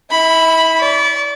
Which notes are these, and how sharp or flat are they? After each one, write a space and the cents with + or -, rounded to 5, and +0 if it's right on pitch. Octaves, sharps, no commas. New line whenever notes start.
E4 -30 B5 +0
D5 -30 C#6 +5